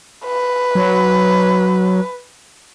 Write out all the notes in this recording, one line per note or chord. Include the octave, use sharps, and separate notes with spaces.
B4
F#3